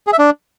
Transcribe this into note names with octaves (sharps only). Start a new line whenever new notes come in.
G#4
E5
D4